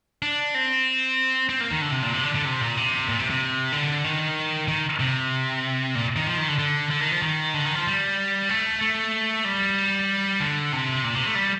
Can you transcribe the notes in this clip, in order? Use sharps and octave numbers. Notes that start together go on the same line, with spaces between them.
D4
C4
C4
A#3
D#3
D3
C3
A#2
C3
D3
D3
C3
A#2
C3
A#2
C3
C3
D3
D#3
D#3
C3
A#2
D#3
F3
D#3
D3
D3
D3
D#3
F3
D#3
D3
D#3
F3
G3
A3
A3
G3
D3
C3
A#2
C3
A3
G3